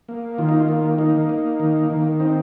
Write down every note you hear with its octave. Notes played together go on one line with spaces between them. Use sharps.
A#3
D#3 F4
D#4
F4
A#3
A#3 D#4
A#3
D#3
D#3
C4 D#4